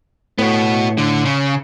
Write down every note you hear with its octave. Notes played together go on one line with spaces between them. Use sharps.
A2 B3 F#4
D3
C#3